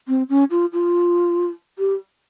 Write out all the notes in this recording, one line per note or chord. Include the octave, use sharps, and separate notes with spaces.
C4
C#4
F4
F4
G4